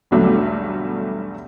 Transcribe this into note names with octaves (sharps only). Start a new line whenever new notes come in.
B1 E2 D3 F#3 G3 A3